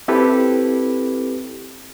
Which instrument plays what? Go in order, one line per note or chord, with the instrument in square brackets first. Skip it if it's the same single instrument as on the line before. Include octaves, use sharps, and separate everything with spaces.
[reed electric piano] C4 E4 G4 A4 B4